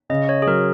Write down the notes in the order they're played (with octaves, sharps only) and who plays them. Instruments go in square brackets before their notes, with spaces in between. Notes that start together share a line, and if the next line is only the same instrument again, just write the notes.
[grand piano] C#3 [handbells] D#5
[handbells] C#5
G#4
[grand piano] F#3 [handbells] A#4